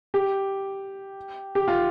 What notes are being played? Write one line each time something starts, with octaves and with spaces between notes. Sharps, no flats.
G4
G4
F4